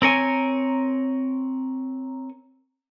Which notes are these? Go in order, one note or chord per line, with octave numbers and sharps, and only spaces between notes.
C4 A#4 C#5 G#5